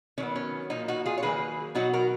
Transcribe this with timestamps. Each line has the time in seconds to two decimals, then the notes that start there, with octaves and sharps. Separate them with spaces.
0.18 D#3 F#3 B3 C#4
0.36 C#4
0.70 A#2 F3 A#3 D#4
0.88 D#4 F#4
1.06 F4 G#4
1.18 C#5
1.23 D#3 F#3 A#3 G#4 B4
1.75 B2 F#3 B3 D#4 F#4
1.93 F#4 A#4